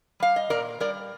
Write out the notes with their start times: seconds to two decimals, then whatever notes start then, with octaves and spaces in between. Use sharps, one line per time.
0.20 G3 F5
0.36 D#5
0.50 A#2 A#4 D5
0.80 G3 A#4 D5